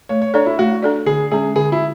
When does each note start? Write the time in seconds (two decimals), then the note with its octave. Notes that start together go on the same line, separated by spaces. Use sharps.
0.09 A3 C#5
0.22 C#5
0.34 D4 A4 C#5 D5
0.46 E4
0.59 A3 F#4
0.82 D4 A4 D5
1.06 D3 G#4
1.31 G#3 C#4 G#4
1.56 D3 G#4
1.72 E4